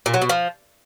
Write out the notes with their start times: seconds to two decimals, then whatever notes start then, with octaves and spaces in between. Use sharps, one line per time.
0.06 A#2
0.14 F#3
0.22 B2
0.29 F3